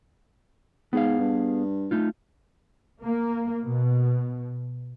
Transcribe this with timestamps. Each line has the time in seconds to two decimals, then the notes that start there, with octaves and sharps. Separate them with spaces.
0.93 G#2 B3 G#4 F5
1.20 G2
1.91 A3 D#4 F4
3.04 A#3
3.63 B2